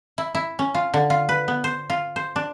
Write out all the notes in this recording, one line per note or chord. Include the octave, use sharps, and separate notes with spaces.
E4
E4
C#4
F4
D3
F4
B4
B3
C5
F4
C5
D4